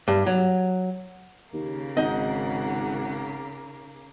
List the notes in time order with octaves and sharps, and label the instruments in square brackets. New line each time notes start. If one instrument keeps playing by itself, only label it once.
[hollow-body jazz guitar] G2
F#3
[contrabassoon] D#2 [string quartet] C#3 A#3
[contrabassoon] G#1 [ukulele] D#4 D#5 [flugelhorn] F#5